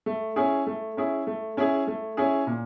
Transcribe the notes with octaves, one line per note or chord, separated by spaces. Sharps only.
A3
C#4 E4 G#4
A3
C#4 E4 G#4
A3
C#4 E4 G#4
A3
C#4 E4 G#4
A#2